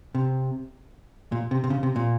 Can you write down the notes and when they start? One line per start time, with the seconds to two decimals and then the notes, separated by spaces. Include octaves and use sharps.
0.15 C3
1.32 A#2
1.51 C3
1.64 C3
1.70 C#3
1.83 C3
1.96 A#2